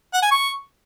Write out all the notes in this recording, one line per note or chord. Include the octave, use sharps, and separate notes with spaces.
F#5
G#5
C#6